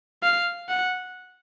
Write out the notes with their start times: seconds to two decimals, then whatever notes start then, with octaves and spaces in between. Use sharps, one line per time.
0.23 F5
0.69 F#5